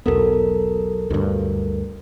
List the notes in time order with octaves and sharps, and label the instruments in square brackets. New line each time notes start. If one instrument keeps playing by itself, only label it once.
[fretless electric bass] B1 E2 B3 [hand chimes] A4 A#4
[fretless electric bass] D2 G2